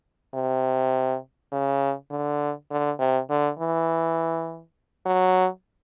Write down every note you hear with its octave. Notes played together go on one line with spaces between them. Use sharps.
C3
C#3
D3
D3
C3
D3
E3
F#3